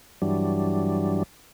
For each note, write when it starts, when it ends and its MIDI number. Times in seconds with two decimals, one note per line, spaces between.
0.22 1.23 43
0.22 1.23 52
0.22 1.23 54
0.22 1.23 55
0.22 1.23 62